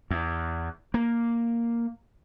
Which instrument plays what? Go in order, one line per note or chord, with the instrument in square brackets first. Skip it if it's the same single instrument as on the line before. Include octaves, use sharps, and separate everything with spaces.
[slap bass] E2
A#3